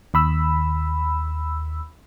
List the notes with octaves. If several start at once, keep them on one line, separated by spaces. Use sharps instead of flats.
D#2 B5 E6